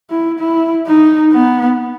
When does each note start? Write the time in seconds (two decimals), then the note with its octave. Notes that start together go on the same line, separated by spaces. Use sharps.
0.10 E4
0.40 E4
0.87 D#4
1.33 B3